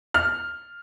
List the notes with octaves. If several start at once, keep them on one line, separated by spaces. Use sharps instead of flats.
F6